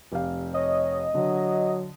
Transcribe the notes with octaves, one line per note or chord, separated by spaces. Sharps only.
F1 G4 F5
C#5 D#5
D3 F#3